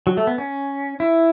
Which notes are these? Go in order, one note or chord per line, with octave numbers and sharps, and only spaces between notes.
F#3
A3
B3
C#4
E4